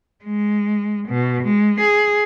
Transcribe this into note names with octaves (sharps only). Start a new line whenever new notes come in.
G#3
B2
G#3
G#4